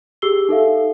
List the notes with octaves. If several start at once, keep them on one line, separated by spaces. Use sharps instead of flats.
G4 G#4 E6 C7 G7
D#4 A4 E5 F5